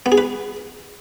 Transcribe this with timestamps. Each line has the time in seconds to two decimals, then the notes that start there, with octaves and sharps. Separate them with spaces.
0.06 B3
0.12 G#4
0.18 B4